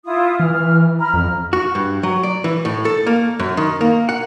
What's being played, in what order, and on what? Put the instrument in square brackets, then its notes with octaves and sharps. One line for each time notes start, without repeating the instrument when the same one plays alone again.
[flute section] E4 F4 D#6
[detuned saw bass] E3 [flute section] F6
[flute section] A#5 B5 F6
[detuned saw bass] F2 [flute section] F6
[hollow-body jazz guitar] F#4
G2
F#3
D5
E3
A2
A4
A#3
F#2
D#3
A#3
F#5